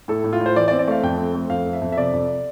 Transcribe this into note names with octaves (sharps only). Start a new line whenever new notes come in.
A2 A4
A2
F4
A2
C5
E3 D5
D5
C4
D5
A3 F5
F2 G5
C4
A3
F2 F5
F2
E5
F2
E5
C3 D5
F2